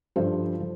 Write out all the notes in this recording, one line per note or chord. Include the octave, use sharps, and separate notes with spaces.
G2 F3 A4 C5
F3